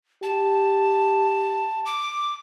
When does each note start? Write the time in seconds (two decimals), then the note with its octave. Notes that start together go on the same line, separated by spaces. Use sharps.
0.23 G4 A5
1.86 D6